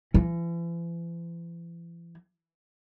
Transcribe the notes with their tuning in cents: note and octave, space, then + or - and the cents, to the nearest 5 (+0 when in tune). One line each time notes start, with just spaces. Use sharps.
E3 +40